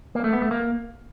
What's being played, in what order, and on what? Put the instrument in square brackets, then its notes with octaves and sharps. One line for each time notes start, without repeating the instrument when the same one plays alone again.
[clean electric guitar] A#3
A3
B3
A3
A#3